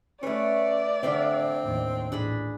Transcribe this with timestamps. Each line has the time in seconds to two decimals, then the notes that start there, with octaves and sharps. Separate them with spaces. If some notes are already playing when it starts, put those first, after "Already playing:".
0.23 A3 C#4 B4 D5
1.03 D3 C4 D4 E5 F5
1.62 D#2 A2
2.12 A1 A#2 D4 G#4 B5